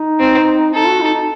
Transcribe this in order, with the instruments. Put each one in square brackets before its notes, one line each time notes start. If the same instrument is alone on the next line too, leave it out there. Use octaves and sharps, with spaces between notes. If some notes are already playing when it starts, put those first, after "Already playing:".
Already playing: [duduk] D#4
[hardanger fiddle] C4
[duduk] D#4 [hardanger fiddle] A4
[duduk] F#4
D#4
D#4